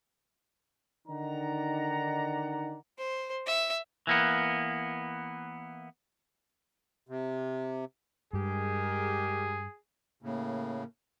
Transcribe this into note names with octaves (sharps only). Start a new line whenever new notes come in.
D3 D#3 D#4 D5 F#5 A#5
C5
E5
E3 A#3 B3
C3
G2 G#3 G4 G#4 A#4
A2 C#3 A#3